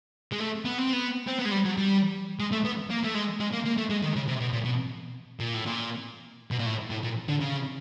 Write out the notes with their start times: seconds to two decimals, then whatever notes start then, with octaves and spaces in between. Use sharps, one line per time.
0.32 G#3
0.40 A3
0.65 B3
0.78 C4
0.93 B3
1.28 C4
1.39 B3
1.46 G#3
1.52 G3
1.65 F#3
1.78 G3
2.40 G#3
2.52 A3
2.65 B3
2.90 A#3
3.04 A3
3.15 G#3
3.40 G#3
3.53 A#3
3.65 A#3
3.77 A3
3.90 G#3
4.03 D#3
4.16 C#3
4.28 C3
4.41 B2
4.53 A#2
4.65 B2
5.40 A#2
5.54 A2
5.66 A#2
6.51 B2
6.59 A#2
6.66 A2
6.90 A2
7.04 A#2
7.29 D3
7.40 C#3